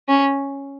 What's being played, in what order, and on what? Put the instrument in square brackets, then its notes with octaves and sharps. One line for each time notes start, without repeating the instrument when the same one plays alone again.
[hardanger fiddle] C#4